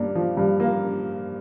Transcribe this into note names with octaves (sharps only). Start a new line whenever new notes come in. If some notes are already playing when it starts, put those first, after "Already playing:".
Already playing: G2 A#3 D4
F3
G2
A#3